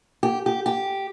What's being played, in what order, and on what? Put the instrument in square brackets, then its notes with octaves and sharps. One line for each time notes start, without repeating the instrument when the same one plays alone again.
[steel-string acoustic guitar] G4
G4
G4